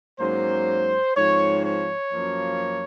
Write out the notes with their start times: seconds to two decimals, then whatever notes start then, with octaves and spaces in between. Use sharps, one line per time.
0.19 G#2 F#3 A#3 C#4 C5
1.16 G#2 F3 C4 C#5
1.65 C#5
2.12 F#2 F3 A#3